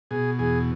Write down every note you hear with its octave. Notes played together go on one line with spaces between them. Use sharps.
B2 G#4
E2 G#4